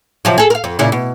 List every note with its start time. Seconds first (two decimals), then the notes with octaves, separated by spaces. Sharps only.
0.25 C3 F3 F#3
0.38 G#4 A4
0.50 A#4 F5
0.64 F2
0.79 A#2 C#3 E4
0.92 B2